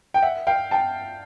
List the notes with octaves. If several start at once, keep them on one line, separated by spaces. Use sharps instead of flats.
G5
E5 F#5
F5 G5
G5 A5